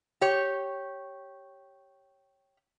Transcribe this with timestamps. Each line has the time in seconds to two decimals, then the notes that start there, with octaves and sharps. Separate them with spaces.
0.21 G4 C#5